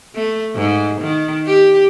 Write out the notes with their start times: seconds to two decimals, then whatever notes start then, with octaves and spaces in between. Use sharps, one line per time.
0.15 A3
0.56 G#2
1.02 D#3
1.46 G4